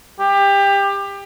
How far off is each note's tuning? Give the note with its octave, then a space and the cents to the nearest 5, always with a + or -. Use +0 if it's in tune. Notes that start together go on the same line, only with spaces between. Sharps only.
G4 +25